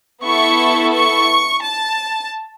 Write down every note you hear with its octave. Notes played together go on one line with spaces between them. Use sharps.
B3 E4 A4 C#6
C#6
A5